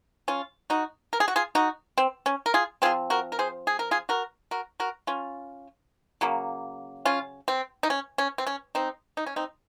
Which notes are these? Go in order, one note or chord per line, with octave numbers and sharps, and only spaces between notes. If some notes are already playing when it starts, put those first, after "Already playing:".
C#4 F4
D#4 F#4
A#4
G#4
F#4
F4 G#4
D#4 F#4
C4
C#4
A#4
F4 G#4
F3 C4 F4 G#4
F#4 A#4
A#4
G#4 C5
G#4
A#4
F4 G#4
F#4 A#4
F#4 A#4
F#4 A#4
C#4 F4
C#3 F#3 A#3
C#4 F4
C4
D#4
C#4
C#4
C4
C#4
C4 D#4
D#4
C#4
C4 D#4